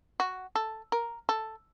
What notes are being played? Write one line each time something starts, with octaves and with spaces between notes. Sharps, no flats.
F#4
A4
A#4
A4